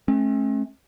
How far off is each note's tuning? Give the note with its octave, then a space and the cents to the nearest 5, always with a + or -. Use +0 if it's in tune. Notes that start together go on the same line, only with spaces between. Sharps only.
A3 -35 C#4 -45